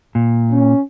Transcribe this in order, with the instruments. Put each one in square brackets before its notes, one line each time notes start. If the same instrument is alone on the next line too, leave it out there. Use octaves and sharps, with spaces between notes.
[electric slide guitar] A#2
[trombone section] C#4